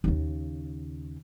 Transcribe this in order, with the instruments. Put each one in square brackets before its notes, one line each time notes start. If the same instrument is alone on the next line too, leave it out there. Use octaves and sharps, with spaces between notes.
[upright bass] D#2 C#3